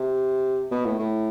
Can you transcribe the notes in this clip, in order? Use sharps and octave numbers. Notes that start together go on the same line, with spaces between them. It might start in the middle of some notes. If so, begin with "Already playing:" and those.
Already playing: C3
B2
A2
A2